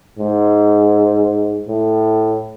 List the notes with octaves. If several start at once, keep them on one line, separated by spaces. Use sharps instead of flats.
G#2
A2